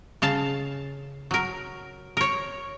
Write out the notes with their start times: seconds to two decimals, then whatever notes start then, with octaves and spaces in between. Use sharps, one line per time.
0.22 C#3 F5 A5
1.31 F#3 A#4
2.17 A#4 C#5